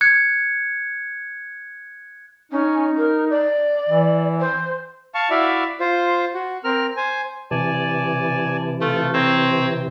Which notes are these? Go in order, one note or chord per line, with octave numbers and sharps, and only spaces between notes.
F#6 G#6 C#7
C#4 D#4
A#4
D5
E3
C5
F5 A5 C#6
E4 F#4 D5 E5 F5
F4 C5
F#4
C4 A#4 F6
C5 G#5
C3 E3 D5 G#5 A5
A3 F4
C4 C#5 A#5